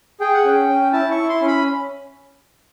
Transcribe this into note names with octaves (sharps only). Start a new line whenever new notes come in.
G#4 G5
F#5
C#4 G5
C#4
E4 A5
C#6
E4
C6
C#4
B5